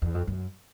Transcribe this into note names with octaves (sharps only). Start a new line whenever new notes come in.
E2
F2
F#2